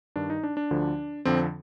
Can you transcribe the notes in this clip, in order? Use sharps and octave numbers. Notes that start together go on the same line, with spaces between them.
G2 D#3 D4
D#4
D4
D4
D2 D3 F3
F2 D3 F3 C4